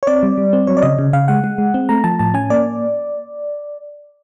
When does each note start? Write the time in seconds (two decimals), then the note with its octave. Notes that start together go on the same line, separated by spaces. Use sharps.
0.03 C#5
0.07 C4 D5
0.23 G3
0.38 G3
0.53 C4
0.67 F#3 C#5
0.77 D5
0.83 C#3 D#5
0.99 C#3
1.13 C#3 F5
1.28 G#3 F#5
1.44 G#3
1.58 G#3
1.74 C4
1.89 A3 A#5
2.04 F3 A5
2.19 A2 A5
2.34 C#4 G#5
2.50 A#3 D5